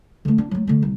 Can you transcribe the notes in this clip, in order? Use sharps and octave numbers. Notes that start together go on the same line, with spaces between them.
D3 A3
D4
F#3 A3
D3 A3
C2